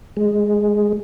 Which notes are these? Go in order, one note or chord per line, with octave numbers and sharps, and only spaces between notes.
G#3